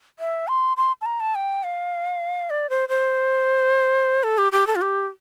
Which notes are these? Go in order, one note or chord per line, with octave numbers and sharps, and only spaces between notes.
E5
C6
C6
A5
A#5
A5
G5
F5
D5
C5
C5
A4
G4
G4
A4
F4
G4